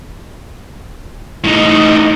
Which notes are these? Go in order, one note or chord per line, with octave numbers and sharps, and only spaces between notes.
A2 D#4